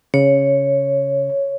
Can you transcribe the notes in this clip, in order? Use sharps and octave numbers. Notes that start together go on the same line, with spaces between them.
C#3 C#5